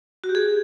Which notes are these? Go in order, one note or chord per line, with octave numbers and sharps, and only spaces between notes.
F#4
G4
G#4